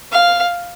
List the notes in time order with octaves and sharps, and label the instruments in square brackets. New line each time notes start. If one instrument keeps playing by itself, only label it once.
[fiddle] F5